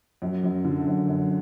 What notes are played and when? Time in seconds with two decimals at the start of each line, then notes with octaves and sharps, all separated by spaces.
0.22 F#2
0.44 F#2
0.65 D3
0.88 F#2
1.08 F#2